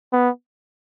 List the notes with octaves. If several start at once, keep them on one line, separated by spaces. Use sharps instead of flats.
B3